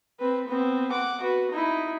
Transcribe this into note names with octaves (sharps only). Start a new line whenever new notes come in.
C4 B4
B3 C4
F#5 D6
F#4 B4
D#4 E4